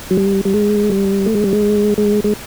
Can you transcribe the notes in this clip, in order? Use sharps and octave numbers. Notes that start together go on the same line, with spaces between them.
F#3
G3
G3
G#3
G3
A3
G#3
G3
G#3
G#3
G#3